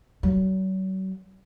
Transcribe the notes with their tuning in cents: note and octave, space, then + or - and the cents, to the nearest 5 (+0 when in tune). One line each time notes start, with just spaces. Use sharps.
F#3 +40